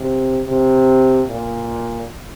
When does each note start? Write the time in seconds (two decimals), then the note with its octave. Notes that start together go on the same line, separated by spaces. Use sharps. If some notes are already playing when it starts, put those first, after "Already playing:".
Already playing: C3
0.47 C3
1.28 A#2